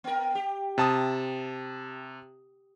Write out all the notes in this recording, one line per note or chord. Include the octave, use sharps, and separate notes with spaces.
B3 A#4
G4
C3 A5 D#6